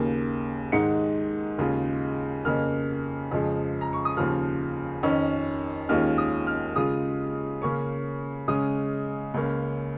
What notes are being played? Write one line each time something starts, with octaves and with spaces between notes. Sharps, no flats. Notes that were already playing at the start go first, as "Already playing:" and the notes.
Already playing: D#2 C#3 A#3
G#2 D#3 G#3 D#4 C#7
D#2 C#3 G#3 F4
F2 C#3 A#3 F6
F2 C#3 F3 G#3
A#5
C#6
D#6
D#2 C#3 F3 F6
F2 D#3 C#4
D#2 D#3 G#3 C#4 F4 F6
D#6
F6
C#3 G#3 F4 D#6
C#3 A#3 C#4 C#6
C#3 G#3 C#4 D#6
C#2 C#3 A#3 C#4